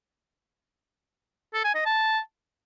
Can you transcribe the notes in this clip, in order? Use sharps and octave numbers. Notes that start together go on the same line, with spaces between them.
A4
G#5
D#5
A5